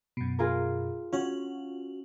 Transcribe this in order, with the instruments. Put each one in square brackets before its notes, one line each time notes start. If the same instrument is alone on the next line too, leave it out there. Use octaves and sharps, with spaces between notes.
[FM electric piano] F#2 B2
[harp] F4 G#4 A#4
[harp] C#4 [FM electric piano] F4 F#4